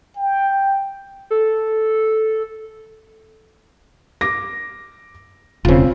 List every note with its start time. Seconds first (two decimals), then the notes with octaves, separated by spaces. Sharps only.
0.16 G5
1.31 A4
4.21 D6 A#6
5.65 E1 C#3 C4 F4